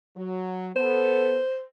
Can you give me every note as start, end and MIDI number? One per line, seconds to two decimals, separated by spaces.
0.16 0.71 54
0.76 1.40 59
0.76 1.40 69
0.76 1.63 72